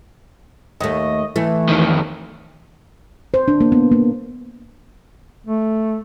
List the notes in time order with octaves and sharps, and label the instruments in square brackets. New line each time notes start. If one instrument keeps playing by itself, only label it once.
[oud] D#2 A3 [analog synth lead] D#5
[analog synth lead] E3 [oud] A3
[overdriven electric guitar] F2 D#3
[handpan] C5
D4
A#3
B3
A#3
[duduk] A3